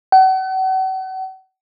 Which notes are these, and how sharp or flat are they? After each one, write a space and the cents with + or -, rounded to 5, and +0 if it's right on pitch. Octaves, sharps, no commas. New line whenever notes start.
F#5 +40